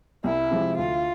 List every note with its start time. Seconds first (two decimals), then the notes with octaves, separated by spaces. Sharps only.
0.24 C2 E4
0.51 C3 F3 G#3
0.77 D2 F4